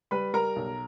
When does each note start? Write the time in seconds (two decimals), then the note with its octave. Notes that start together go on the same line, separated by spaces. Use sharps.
0.11 G3 B4 B5
0.34 G3 A#4 A#5
0.56 B1